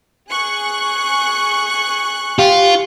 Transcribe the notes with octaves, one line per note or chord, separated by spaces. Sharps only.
G#4 C#6 F#6
F4 G4